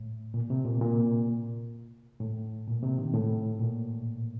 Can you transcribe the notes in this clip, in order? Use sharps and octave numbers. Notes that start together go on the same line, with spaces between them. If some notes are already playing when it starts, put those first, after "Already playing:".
Already playing: A2
A#2
C3
A#2
A#2
A2
A#2
C3
D#3
A2
A#2